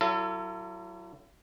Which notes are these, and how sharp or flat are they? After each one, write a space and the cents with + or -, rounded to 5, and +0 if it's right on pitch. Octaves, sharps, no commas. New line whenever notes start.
F#3 +20 E4 +45 A4 +30